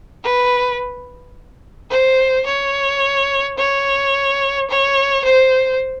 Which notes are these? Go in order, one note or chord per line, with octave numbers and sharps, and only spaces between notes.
B4
C5
C#5
C#5
C#5
C5